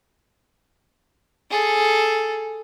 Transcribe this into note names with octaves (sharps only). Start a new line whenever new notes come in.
G#4 A4